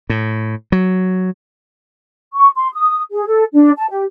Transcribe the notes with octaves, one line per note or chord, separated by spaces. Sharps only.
A2
F#3
C#6
C6
D#6
G#4
A4
D4
A5
G4